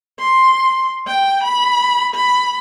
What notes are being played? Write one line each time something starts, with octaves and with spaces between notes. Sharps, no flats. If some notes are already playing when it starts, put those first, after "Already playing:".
C6
G5
B5
B5